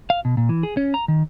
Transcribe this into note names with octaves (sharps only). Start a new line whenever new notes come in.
F5
B2
A#2
E3
G#4
C#4
A#5
D#3